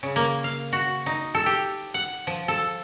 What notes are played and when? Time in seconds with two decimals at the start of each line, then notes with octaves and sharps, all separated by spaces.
0.03 C#3
0.16 A#3
0.44 F5
0.73 F#4
1.06 D#4
1.35 A4
1.46 G4
1.94 F#5
2.27 F3
2.48 A4